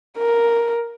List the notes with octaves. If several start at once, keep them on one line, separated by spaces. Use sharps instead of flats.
A#4